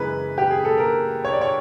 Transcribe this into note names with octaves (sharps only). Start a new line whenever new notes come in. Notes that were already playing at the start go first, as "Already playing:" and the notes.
Already playing: F#2 C#3 E3 G#3 B4
G4
G#4
A4
A#4
C#5
D5
C#5